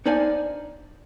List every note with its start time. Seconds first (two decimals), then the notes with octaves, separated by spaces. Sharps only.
0.06 D4 D#4 C5 D5 F5 G#5